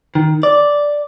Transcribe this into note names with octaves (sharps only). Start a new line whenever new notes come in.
D#3
D5